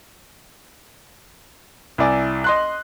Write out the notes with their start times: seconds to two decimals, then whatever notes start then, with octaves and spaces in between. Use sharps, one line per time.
1.98 C2 E4 D5 G#5
2.44 D#5 C6 F#6